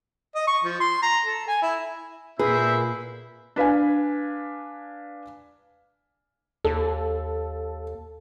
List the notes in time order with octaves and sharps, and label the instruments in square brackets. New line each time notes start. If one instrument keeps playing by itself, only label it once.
[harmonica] D#5
C#6
F3
C6
A#5
A4
G#5
E4
[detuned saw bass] A#2 [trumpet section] C4 E4 E5 [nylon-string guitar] G#4 [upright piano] B4
[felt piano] D4 B4 F5 G#5
[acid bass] D#2 [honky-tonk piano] A4